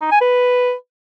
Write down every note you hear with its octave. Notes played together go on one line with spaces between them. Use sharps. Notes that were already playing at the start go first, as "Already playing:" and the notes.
D#4
G#5
B4